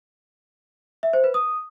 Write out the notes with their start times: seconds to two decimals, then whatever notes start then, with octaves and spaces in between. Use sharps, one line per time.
1.03 E5
1.13 C5
1.24 B4
1.34 D#6